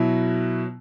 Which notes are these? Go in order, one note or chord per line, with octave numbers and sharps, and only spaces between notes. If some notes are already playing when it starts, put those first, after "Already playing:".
Already playing: B2 F#3 E4